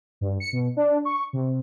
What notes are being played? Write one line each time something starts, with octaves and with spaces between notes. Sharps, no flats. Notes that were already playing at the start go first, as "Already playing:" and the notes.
G2
C#7
B2
D4
C#6
C3